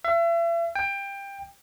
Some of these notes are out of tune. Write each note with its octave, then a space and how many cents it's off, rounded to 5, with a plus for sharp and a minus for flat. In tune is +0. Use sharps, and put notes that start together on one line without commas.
E5 +40
G5 +20